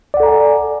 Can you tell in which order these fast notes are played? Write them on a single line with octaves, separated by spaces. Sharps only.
D5 F#5 A4 A#5 G#5